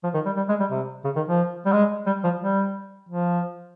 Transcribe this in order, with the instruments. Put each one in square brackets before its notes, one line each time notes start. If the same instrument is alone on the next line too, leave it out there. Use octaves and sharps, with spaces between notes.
[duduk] F3
D#3
G3
G3
G#3
G3
C3
C#3
D#3
F3
G3
G#3
G3
F3
G3
F3